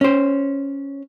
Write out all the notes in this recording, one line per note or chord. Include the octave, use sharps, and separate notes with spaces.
C#4 C5